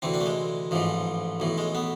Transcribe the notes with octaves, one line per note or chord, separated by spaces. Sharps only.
D2 C3 E3 C4
D4
A3
G#3
A1 G#2 E3 F3
B1 A2 E3
G#3
B3